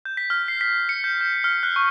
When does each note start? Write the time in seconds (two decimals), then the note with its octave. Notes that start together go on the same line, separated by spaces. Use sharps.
0.05 G6
0.17 B6
0.30 F6
0.48 C7
0.61 B6
0.89 C#7
1.04 G6
1.21 G6
1.44 F6
1.63 F#6
1.76 C#6